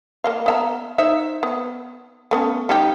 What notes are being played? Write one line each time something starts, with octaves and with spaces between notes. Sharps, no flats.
A#3 D#5 F5
B3 E5 A#5
D#4 C5 E5
B3
A3 B3 C#4
G3 D#4 G4